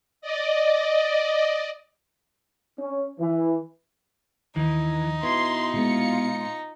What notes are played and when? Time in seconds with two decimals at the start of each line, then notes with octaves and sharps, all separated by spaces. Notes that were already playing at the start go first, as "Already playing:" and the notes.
0.21 D5 D#5
2.79 C#4
3.19 E3
4.56 D#2 D#3 E3 D#4
5.23 B2 E4 B4 C6
5.74 A#2 G#3 B3 F4 C#7